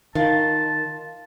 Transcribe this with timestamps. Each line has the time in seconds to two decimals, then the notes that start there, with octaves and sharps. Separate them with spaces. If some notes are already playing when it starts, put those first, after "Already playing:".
0.15 D#3 F4 F5 A5